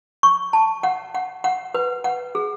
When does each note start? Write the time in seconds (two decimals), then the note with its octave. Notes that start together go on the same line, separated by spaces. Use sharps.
0.23 C#6
0.53 A5
0.83 F#5
1.15 F#5
1.44 F#5
1.75 B4
2.04 F#5
2.35 G#4